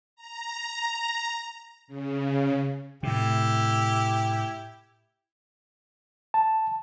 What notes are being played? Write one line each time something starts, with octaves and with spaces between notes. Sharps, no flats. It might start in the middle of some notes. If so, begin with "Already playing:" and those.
A#5
C#3
A2 C3 E4 G4
A5